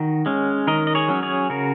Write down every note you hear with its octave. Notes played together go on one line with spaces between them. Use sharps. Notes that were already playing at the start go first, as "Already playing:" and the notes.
Already playing: D#3 F#4
G#3 C#4
D#3 A#4 D#5
D#5
G#4 C#5
F#3 C#4
G#4 C#5
C#3 F#4 A#4